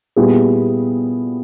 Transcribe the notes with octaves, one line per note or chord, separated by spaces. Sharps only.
A#2 G3 B3 E4 G#4